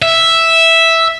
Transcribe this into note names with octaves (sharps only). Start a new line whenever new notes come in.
E5